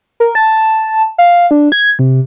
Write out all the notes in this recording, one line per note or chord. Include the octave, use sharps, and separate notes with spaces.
A#4
A5
F5
D4
G#6
C3